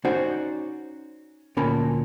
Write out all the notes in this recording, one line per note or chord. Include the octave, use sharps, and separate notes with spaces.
C#4 D#4 F#4 C5 D5
D2 A#2 C#4 A#4 A5 B5